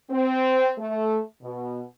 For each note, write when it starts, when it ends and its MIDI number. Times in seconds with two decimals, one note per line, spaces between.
0.11 0.71 60
0.78 1.19 57
1.42 1.81 47